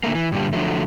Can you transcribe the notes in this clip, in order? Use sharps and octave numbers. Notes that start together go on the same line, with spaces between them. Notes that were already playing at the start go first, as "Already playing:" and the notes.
A#2 D3 A3 A#3
E3
G2 A#2 D3 G3
D3 F3 F#3 A3